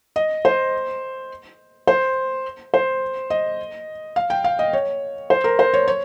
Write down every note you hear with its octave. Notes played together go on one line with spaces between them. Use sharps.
D#5
C5
C5
C5
D#5
F5
G5
F5
D#5
C#5
C5
A#4
C5
C#5
C#5